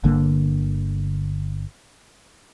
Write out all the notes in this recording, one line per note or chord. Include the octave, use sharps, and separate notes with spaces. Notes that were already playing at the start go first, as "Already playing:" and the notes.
G1 D3 A#3